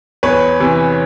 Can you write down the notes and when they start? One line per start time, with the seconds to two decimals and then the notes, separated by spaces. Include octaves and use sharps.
0.23 E2 B4 C#5
0.60 C3 E3